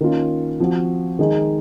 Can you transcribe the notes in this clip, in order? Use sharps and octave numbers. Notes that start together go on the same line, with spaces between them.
D#3 A#3 C#4 F4
F3 C4 F#4
D#3 G#3 D#4